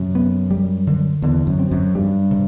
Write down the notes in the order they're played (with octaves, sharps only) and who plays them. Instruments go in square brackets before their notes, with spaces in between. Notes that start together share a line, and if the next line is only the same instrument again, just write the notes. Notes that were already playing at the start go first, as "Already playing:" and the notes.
Already playing: [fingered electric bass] F#2 [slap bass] C3
[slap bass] B3
G3
D3
[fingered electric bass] E2 [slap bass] D3
[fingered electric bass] F#2
[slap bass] C4
[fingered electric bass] F#2
[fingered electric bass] G2 [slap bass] G3
[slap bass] C3